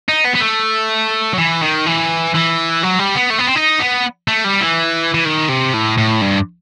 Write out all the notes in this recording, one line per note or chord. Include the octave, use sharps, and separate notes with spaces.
D#4
B3
B3
A3
F#3
E3
D#3
E3
E3
F#3
G3
B3
A3
B3
C4
D#4
B3
A3
G3
E3
E3
D#3
C3
A2
A2
G2